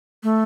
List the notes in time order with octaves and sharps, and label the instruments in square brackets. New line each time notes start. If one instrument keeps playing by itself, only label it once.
[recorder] A3